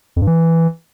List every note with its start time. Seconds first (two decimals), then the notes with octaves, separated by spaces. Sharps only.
0.16 F2
0.22 G2
0.27 E3